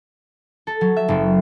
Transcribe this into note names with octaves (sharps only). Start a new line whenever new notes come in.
A4
F#3
E5
F#1